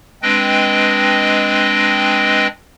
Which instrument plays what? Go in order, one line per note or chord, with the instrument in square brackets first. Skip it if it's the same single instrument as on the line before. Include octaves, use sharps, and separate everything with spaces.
[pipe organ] G#3 C4 D4 B4 D#5 G5